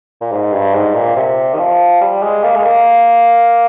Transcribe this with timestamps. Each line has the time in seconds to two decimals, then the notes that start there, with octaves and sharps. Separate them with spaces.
0.21 A#2
0.32 G#2
0.53 G2
0.74 G#2
0.95 A#2
1.16 C3
1.54 D#3
1.59 F3
2.01 G3
2.23 G#3
2.44 A#3
2.56 G#3
2.65 A#3